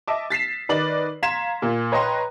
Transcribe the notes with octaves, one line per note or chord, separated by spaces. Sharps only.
D#5 E5 A5 D6
A6 B6 C7 E7
D#3 B4 D5 D#5 F#7
F5 A#5 C6 G#6 B6 E7
A#2
B4 C#5 D#5 G5 A#5 C6